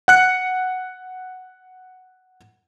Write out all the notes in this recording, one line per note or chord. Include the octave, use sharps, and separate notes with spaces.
F#5 F#6 C#7